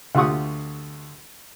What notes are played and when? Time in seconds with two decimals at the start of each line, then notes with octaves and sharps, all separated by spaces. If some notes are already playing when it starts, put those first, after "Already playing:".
0.15 D2 F4 G4 F#5 C#6 D#6